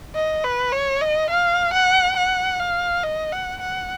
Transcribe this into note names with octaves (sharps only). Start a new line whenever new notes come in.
D#5
B4
C#5
D#5
F5
F#5
F#5
F5
D#5
F#5
F#5